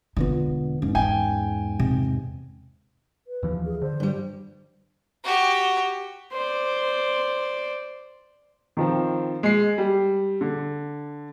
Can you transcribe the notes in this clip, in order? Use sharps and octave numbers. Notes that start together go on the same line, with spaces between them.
E1 D3 B3 D#4 F4
E2 G#2 C#4
C#4 G5 G#5
C3
B4
D#2 E3 F3
G#4
D3 C5
G2 G3
F#4 G4
C5 D5
D#3 F3 C4
G#3 C7
G3
D3